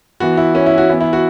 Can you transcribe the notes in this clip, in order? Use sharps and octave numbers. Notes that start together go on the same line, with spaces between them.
E3 B3 F#4
E4
C#4
E4
F#4
E3 B3 E4
E4
F#4